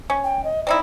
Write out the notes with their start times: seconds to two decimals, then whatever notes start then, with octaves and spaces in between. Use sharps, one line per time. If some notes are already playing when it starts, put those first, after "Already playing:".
0.10 C#4
0.24 G5
0.44 D#5
0.67 C4 D#4 E4 D5